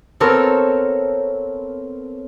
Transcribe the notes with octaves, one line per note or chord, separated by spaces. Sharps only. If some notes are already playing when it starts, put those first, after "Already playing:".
B3 C4 A4 A#4 C#5